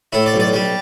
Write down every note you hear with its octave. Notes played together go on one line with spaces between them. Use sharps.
A2 E4
D5
B1
D5
G3